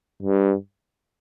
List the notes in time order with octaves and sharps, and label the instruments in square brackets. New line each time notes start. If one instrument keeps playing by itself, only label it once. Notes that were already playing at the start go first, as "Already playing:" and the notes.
[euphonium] G2